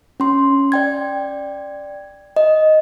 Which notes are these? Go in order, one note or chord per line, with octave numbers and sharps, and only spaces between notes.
C#4 C6
D5 G5 G#6
D#5